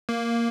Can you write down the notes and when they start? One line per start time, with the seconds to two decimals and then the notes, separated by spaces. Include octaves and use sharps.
0.09 A#3